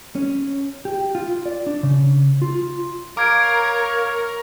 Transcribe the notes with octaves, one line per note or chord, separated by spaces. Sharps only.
C#4
G4
F4
D5
D4
C#3
F4
A#4 C#5 F5 D6 G#6 D7